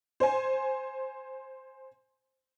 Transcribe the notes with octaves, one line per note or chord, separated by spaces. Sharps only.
C5 G#5